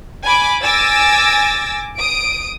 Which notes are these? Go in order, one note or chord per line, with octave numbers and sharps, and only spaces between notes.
G#5 B5 D6
G#5 D6 E6 A6 A#6
D#6 D7